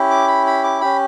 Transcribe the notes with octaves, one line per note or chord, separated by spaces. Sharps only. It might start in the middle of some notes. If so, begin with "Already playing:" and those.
Already playing: C#4 E4 G4
D6
B5
B5
D6
C#4 G4 B5